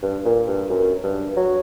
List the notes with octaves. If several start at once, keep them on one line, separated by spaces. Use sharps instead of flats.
G2
A#2
G2
F#2
G2
F#3